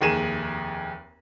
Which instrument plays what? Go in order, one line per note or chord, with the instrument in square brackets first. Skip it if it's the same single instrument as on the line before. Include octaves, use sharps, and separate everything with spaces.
[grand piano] F1 D#2 G#4 D#7 E7